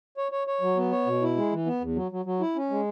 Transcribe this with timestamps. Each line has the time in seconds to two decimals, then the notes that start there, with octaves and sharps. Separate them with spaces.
0.17 C#5
0.32 C#5
0.47 C#5
0.61 F#3
0.77 B3
0.91 C#5
1.06 B2
1.22 E4
1.37 G#3
1.52 E3
1.66 B3
1.81 E2
1.96 F#3
2.11 F#3
2.25 F#3
2.41 E4
2.56 C#4
2.70 G#3